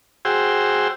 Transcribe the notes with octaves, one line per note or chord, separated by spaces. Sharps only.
F#4 G#4 C5 G5 E6